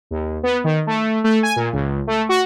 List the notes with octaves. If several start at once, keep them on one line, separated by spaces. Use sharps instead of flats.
D#2
B3
D#3
A3
A3
G#5
A#2
C#2
A3
F#4